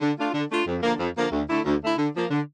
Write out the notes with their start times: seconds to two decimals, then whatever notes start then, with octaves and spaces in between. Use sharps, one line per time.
0.01 D3
0.17 A3 D4 F4
0.33 D3
0.50 A3 D4 F4
0.66 F2
0.83 D3 F3 A#3
0.99 F2
1.15 D3 F3 A#3
1.32 D2
1.48 D3 A3 E4
1.65 D2
1.81 D3 A3 E4
1.97 D3
2.14 F3 A#3
2.30 D3